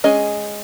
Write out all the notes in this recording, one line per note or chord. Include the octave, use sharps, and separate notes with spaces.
G#3 C#4 G#4 D#5